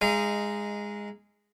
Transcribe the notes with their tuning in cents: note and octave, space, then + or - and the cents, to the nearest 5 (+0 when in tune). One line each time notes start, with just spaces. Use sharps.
G#3 -10 D#4 +0 F5 -40